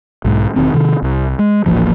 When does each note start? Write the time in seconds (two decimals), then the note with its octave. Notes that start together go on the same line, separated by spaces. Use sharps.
0.25 B1 G#2
0.56 E1 D#3 C4
0.74 C3 D#3
1.02 C2
1.39 G#3
1.66 D#1 A1 A#2 F3